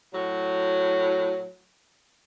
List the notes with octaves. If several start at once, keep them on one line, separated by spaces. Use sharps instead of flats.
A2 F#3